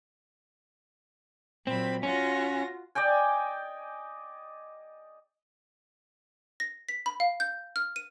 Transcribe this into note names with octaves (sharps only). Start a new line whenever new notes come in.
A#2 F#3 C4 B5
C#4 F4 F#4 A#6
D5 D#5 G5 G#5
A#6
B6
B5
F5
G6
F6
D#7